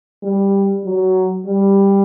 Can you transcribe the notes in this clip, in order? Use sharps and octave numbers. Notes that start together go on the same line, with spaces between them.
G3
F#3
G3